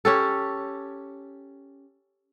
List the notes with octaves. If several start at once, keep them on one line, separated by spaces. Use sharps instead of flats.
C#4 G4 A4